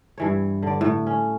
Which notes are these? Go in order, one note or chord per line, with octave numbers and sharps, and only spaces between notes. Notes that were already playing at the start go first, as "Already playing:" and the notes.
G2 E3 C#5
D3 D5
A2
C#4